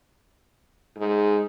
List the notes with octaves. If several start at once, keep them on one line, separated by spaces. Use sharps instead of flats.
G#2 G#3